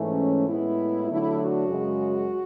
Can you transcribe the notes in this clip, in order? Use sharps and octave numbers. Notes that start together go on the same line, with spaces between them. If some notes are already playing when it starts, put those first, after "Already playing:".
Already playing: G#2 E3 A3 C#4
A2 G#3 B3 E4
D3 F#3 A3 D4 E4
F#4
F#2 C#3 G#3